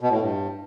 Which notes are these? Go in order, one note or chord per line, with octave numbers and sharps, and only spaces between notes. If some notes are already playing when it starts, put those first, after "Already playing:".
B2
A2
G2